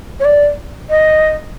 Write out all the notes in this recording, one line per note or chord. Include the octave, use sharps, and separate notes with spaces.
C#5
D5
D#5